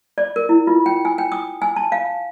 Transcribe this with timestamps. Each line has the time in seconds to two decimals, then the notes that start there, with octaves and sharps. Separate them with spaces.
0.18 D5
0.36 A#4
0.49 E4
0.67 F4
0.86 G5
1.05 G#5
1.18 G5
1.32 D#6
1.62 G#5
1.76 A5
1.92 F5